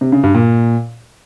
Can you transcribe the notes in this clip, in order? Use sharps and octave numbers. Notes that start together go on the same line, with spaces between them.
C3
C#3
G2
A#2